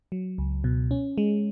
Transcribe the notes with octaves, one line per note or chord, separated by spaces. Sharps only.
F#3
C#2
B2
C#4
G#3